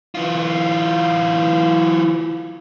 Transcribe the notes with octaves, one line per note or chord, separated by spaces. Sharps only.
E3 F4